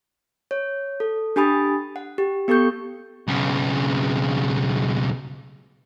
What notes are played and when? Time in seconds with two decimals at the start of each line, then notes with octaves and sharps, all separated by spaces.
0.51 C#5
1.00 A4
1.36 D4 G4 G#5 B5 D#6 A6
1.96 F#5
2.18 G4
2.48 B3 G4 A4 C#6 G6
3.28 B1 C#3